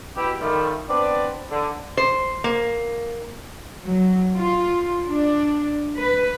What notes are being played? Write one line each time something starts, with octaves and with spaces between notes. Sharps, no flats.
B2 E4 G4
D#3 F3 G3 A3
B3 C4 D4 B4 D5
D3
C5
A#3
F#3
F4
D4
B4